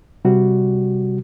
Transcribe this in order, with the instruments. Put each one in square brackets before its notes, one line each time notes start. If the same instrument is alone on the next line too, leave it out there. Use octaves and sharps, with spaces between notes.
[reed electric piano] C3 G3 F#4